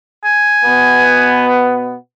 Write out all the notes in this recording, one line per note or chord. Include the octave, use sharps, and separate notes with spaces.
G#5
B2 B3